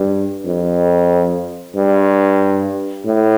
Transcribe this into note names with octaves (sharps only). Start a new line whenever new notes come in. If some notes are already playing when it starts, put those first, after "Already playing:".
Already playing: G2
F2
G2
A2